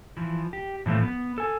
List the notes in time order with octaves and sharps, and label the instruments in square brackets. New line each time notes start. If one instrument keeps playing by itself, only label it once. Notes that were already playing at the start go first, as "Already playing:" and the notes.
[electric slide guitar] E3 F3
G4
A2 E3 F3 A3
B3
A4 G#5